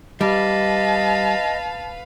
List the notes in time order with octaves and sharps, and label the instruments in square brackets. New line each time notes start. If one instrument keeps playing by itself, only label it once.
[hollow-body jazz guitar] G3 [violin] B4 F5 [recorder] D#5 [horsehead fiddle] A5